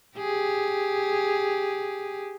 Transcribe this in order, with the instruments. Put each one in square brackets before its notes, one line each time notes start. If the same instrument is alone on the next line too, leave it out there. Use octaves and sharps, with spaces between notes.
[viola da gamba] G4 G#4